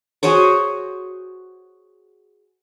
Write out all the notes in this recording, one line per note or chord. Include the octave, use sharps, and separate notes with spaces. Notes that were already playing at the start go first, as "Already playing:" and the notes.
F#4 G#4 C5 C#5